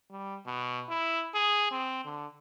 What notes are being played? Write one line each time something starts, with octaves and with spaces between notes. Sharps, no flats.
G3
B2
E4
G#4
C4
D3